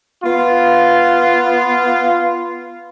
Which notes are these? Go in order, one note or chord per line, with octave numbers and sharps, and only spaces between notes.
B3 F4